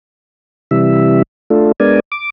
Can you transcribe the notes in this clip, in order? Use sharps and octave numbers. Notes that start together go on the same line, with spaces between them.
C3 E3 G3 E5
A3 D4 F4 A4
G#3 B3 D4 A#4 D5 G#5
D6